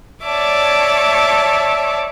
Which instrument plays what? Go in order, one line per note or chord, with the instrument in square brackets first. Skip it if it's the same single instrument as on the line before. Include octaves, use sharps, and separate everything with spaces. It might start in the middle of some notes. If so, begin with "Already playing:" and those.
[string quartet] C#5 D5 E5 A5 D6